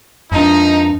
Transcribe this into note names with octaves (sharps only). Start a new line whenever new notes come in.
F2 F3 D4 D#4